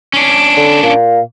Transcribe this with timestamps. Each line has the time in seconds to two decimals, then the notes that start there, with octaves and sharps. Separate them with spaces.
0.14 C#4 D4
0.57 D3
0.83 A#2 F5